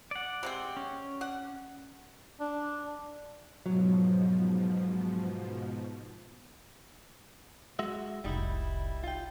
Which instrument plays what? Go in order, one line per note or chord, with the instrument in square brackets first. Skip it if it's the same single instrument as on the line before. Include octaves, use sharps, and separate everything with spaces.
[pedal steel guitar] D5 F#5
[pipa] C3 G#3 C4
[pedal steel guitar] C#4
[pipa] D5 F#5
[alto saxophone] D4
[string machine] G#2 B2 F3 [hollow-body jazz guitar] F#3
[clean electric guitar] G#3 F#4 E5
[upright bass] F1 C2 [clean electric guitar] G3 D#4 E4
[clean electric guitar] F4 G5